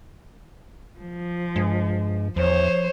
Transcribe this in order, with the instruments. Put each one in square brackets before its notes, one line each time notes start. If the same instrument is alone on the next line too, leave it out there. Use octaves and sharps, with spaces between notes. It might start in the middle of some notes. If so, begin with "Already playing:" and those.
[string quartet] F3
[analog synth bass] G2 [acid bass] G#3
[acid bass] E2 [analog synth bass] F3 [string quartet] C5 C#5